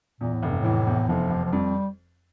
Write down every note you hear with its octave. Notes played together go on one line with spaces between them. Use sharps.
E2 A#2
A2
F1 G2
A2 E3
E2
F1 F3
F1
F3
F2 G3